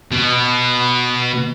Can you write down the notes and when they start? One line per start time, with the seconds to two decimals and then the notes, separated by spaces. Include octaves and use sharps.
0.12 B2